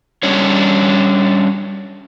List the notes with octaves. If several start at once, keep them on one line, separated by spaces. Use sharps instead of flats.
G3 C#4 D4 C#5